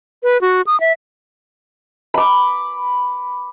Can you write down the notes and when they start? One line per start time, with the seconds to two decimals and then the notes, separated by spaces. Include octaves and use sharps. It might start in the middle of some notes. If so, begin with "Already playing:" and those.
0.23 B4
0.41 F#4
0.67 D#6
0.80 E5
2.14 B5 D6